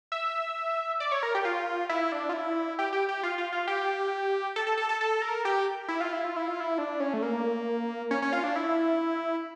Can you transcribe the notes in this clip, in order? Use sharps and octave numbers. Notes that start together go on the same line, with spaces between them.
E5
D5
C#5
A#4
G4
F4
E4
D4
F4
E4
G4
G4
G4
F4
F4
F4
G4
A4
A4
A4
A4
A4
A#4
G4
E4
F4
E4
F4
E4
F4
E4
D4
C#4
A3
A#3
C#4
C#4
F4
D4
E4